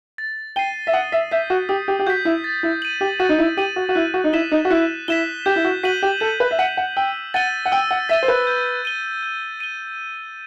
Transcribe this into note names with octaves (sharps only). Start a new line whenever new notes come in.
A6
G5 C7 D#7 G7
E5
F#5 D#6
E5
E5 G6 B6
F#4
G4 D#6
G4
G4
F#4 G6 B6
E4
A6
E4
D#7 F#7
G4
F#4 A6
D#4
E4
G4 D#7 F#7
F#4
F#4
E4 F#6
F#4
D#4
E4 B6 E7 G7
D#4
F#4
E4 F#6
E4 B6 E7 G7
G4 G6
E4
F#4
F#4 B6 D#7 F#7
G4
A4 G6
B4
E5
F#5 B6 D#7 F#7
F#5
G5 E6
F#5 A6 D#7 G7
F#5
G5 E6
F#5
E5 A6 D#7 G7
C5
B4
G6
D#7 G7
G6
D#7 G7